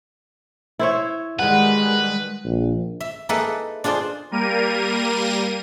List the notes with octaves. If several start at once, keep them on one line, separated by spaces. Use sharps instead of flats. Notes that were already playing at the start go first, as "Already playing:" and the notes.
E4 C5 C#5
D#3 G3 G#3 B4 F#5
A#1
E5
A#3 D#4 E4 G#4 A4 B4
D4 F4 G#4 C5 D5
G3 A#3 A#4 D#7